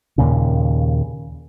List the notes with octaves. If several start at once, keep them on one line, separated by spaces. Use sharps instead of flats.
D#2 A#2 C#3